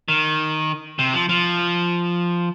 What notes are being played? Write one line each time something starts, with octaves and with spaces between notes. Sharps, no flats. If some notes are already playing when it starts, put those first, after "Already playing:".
D#3
C3
F3
F3